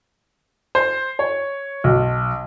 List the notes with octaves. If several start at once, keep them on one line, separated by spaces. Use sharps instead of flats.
C5
C#5
B1